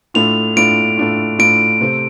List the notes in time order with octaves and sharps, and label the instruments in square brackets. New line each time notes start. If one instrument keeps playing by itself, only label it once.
[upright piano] A2 A3 D4 F4 [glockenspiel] F7
[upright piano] A2 A3 D4 F4 [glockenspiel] D7
[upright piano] A2 A3 D4 F4
[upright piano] A2 A3 D4 F4 [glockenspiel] D7
[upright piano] C3 A3 C4